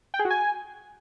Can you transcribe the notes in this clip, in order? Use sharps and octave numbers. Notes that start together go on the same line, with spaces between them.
G5
G#4
F#4
G#5